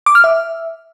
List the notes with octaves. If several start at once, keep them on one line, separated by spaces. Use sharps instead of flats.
D6
F6
E5